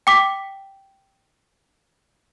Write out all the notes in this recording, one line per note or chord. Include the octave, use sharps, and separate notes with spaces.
G5 D6 B6